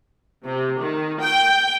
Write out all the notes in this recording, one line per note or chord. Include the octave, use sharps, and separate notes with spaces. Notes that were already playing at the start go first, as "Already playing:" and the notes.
C3
D#3
G5